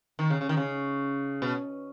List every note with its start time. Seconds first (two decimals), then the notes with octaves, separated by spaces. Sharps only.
0.19 D#3
0.30 C#3
0.41 C#3
0.49 D#3
0.57 C#3
1.42 B2